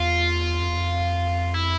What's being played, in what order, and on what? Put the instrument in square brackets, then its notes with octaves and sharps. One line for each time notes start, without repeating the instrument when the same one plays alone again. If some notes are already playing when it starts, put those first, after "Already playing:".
Already playing: [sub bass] E2 [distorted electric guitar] F4
[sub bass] F2
E2
F2
[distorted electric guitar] E4